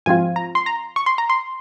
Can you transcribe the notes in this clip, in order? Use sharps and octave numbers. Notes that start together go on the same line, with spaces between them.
G#2 F3 C4 F4 G#5
A#5
C6
A#5
C#6
C6
A#5
C6